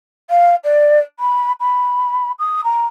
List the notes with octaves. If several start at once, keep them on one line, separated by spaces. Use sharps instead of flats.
F5
D5
B5
B5
D#6
A#5